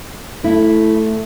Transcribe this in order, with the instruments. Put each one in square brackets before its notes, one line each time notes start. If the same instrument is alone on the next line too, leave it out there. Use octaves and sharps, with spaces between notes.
[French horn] A3 [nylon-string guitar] E4